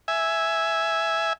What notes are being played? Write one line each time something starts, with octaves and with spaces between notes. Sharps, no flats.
E5 G#5